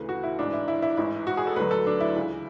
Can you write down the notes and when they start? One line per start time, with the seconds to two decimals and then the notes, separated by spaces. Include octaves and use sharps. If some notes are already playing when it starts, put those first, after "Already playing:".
Already playing: D2 C#3 E3 B4
0.09 F#4
0.23 E4
0.39 A1 G#2 E3 D4
0.53 E4
0.68 E4
0.82 E4
0.97 A1 G#2 E3 E4
1.27 F#4
1.37 G#4
1.47 A4
1.56 D2 D3 F#3 B4
1.71 A4
1.87 D4
2.00 E4
2.16 C#2 C#3 E3